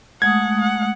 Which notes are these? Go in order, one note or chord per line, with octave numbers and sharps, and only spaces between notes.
G#3 A3 F#5 D#6 G#6
F#5